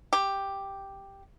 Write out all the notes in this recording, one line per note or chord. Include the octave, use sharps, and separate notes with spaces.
G4